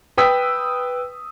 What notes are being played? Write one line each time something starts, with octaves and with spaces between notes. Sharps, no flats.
B4 G5 D#6 E6 B6